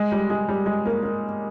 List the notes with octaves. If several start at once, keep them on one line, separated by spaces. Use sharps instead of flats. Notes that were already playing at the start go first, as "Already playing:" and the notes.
Already playing: G#3
G3
G#3
G3
G#3
A#3
A#3